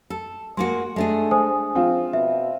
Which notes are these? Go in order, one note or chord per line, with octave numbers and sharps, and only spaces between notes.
A4
G#3 A#3 F#4 C6
G#3 A3 D4 G#4
C5 G#5 D#6
F3 C4 F4
B2 E5